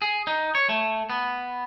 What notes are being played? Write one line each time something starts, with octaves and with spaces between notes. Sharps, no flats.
G#4
D#4
C#5
A3
B3